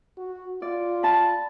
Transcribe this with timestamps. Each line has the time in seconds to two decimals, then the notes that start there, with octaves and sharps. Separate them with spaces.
0.18 F#4
0.62 F4 D5
1.03 A5 B5